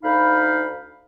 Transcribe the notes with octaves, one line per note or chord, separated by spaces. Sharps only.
D2 D#4 F5 B5